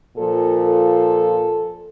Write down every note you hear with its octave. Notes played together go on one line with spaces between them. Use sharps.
A#2 F3 A4
A4